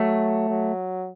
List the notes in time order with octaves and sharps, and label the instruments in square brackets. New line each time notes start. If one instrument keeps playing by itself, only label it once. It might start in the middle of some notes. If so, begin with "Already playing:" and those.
Already playing: [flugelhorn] F#3 [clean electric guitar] A3
[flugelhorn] F#3